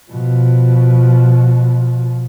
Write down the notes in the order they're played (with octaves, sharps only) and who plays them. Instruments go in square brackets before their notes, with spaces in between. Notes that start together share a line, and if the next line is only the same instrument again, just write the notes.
[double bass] B2 F3